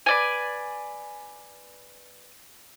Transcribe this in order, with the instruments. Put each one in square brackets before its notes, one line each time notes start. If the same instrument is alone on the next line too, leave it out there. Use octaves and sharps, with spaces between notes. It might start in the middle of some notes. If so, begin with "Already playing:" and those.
[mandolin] B4 D5 G#5